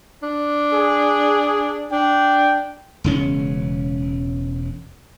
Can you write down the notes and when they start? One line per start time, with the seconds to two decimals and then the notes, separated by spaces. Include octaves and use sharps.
0.23 D4
0.73 G#4
1.92 D4 G5
3.04 E1 C#3 C#4